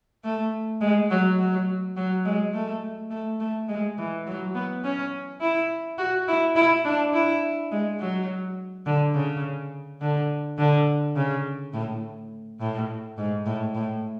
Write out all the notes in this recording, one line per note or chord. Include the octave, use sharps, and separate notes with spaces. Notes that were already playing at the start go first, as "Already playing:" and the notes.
A3
G#3
F#3
F#3
F#3
G#3
A3
A3
A3
G#3
E3
F#3
B3
C#4
E4
F#4
E4
E4
D4
E4
G#3
F#3
D3
C#3
D3
D3
C#3
A2
A2
G#2
A2
A2